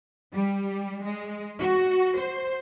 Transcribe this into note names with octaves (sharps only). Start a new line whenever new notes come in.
G3
G#3
F#4
C5